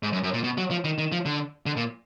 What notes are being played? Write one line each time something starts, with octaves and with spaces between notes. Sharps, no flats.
G#2
F#2
F#2
A#2
B2
F#3
F3
D#3
D#3
F3
D3
D3
A#2